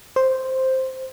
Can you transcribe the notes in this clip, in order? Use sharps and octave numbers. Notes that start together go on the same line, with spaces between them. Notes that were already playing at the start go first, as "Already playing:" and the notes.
C5